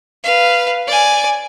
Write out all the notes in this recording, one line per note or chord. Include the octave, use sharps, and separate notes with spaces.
B4 F5
D5 G#5